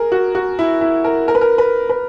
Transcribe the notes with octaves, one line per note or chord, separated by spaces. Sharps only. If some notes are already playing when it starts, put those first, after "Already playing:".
Already playing: G#4 A#4
F#4
F#4
E4
E4
A#4
A#4
B4
A#4
B4
B4